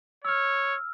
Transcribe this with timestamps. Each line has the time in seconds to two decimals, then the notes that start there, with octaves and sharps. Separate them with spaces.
0.25 C#5 E6 F6